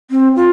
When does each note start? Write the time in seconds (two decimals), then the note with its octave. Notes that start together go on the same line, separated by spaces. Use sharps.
0.11 C4
0.36 F4